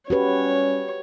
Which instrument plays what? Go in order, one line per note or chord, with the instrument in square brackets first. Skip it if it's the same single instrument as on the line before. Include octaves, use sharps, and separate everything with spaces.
[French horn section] G3 C#4 [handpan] F#4 G4 B4 [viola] C#5